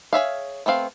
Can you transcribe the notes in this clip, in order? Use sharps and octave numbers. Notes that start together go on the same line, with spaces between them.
G#4 C#5 E5 F5
A3 B3 C4 F5